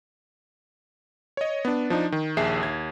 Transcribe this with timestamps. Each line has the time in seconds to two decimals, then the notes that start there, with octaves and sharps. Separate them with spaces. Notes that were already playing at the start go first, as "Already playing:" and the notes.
1.37 C#5 D#5
1.65 B3 D4
1.90 F3 D4 D#4
2.12 D#3
2.37 A#1 D#2 G#4 E5 C7
2.62 D#2 G#6